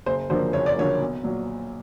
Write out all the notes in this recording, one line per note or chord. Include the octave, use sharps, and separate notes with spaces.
F#1 C5
F#2 D3 F3 A#3 C5
F#1 C#5
D5
F#2 D3 F3 A#3 C#5
B1
A#2 F#3